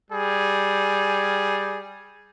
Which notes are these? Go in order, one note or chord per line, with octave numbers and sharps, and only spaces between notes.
G3 G#4